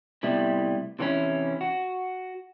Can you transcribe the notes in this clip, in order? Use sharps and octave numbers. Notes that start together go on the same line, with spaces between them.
A2 C3 G3 B3 E4
C3 E3 C4 C#4 E4
F#4